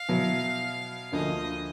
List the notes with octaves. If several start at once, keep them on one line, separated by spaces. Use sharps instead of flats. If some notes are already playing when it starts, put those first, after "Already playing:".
Already playing: F5
B2 F#3 B3 E4
D2 D3 F3 A#3 D#5